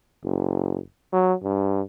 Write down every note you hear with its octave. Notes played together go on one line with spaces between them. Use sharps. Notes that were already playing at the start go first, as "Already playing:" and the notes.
F#1
F#3
G2